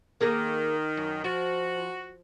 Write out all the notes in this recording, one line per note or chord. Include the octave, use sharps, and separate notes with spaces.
D#3 A#3 G#4 A#4
F#2
F3 F#4